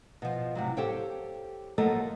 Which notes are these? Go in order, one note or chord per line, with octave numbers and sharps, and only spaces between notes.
B2 F3
A2 C3 F#3
G4 A4 C5 C#5 F5 G5
F3 F#3 A3 A#3 A4 D#5